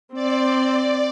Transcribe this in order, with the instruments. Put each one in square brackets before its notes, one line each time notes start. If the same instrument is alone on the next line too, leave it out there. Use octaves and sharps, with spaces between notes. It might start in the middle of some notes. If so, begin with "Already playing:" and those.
[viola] C4 [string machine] D5